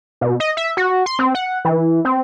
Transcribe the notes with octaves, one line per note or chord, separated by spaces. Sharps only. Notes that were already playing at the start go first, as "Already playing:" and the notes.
B2
D#5
E5
F#4
C6
C4
F#5
E3
C4